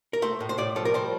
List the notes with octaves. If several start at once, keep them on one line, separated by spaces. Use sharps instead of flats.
A#4
A3 C5
A2
C5
A2 D5
F3 A4
A#4
G3 C5